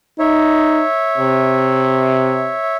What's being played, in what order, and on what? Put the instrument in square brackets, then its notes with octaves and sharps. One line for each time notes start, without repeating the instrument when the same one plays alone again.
[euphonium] D#4 [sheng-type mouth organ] C#5 E5
[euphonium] C3